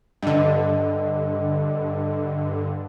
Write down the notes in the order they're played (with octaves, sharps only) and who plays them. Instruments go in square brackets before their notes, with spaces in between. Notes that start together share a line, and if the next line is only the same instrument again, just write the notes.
[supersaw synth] G2 D3 [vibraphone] D#5